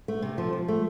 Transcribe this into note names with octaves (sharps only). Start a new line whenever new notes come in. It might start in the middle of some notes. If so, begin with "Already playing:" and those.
A3
C3
F3
F3
A3